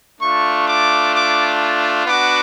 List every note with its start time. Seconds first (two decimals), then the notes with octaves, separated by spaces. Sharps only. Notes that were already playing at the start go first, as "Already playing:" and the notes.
0.20 A3 D4 F4 C#6
0.67 D6
1.13 D6
2.06 B3 D4 F#4 D6